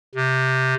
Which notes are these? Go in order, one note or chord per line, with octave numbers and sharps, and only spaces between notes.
C3